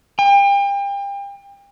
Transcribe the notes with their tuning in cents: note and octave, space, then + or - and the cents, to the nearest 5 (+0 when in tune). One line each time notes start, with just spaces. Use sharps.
G5 +35